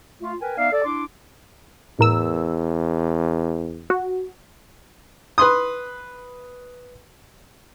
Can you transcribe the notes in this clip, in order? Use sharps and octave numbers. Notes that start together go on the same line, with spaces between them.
A3 F4
A#4 B4 G5 G#5
B3 D#4 D5 E5 F5
A4 D5
D4 E4 C6 D6
E2 A2 A#4 E6
F#4
B4 C6 D#6